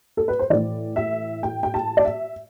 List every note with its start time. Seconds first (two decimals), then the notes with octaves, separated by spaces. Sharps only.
0.17 A4
0.28 B4
0.39 C5
0.50 A2 E3 D5
0.96 E5
1.43 G5
1.63 G5
1.74 A5
1.97 D5
2.05 E5